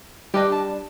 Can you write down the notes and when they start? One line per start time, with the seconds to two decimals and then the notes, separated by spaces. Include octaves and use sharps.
0.34 G3 D4 G4 B4 D#5
0.52 A5